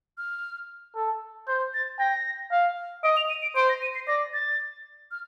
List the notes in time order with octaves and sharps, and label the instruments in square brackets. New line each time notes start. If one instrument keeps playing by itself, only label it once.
[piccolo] F6
[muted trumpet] A4
[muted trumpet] C5 [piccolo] G6
[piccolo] A6
[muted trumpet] G5 [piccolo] A#6
[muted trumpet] F5
[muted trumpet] D#5 [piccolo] D7
[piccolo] F7
D#7
D7
[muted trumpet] C5 [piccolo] D7
[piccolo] A#6
D#7
C7
[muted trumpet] D5 [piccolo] A#6
[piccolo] A6
F6